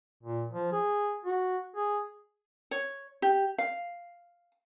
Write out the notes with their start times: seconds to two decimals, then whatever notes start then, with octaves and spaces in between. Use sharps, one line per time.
0.23 A#2
0.51 F3
0.72 G#4
1.25 F#4
1.76 G#4
2.71 C#5
3.22 G4
3.58 F5